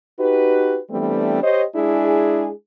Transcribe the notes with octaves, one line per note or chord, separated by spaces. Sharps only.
D#4 F#4 G4 B4
E3 G3 A3 B3 C4 D4
G4 C5 C#5 D#5
G#3 D4 E4 G#4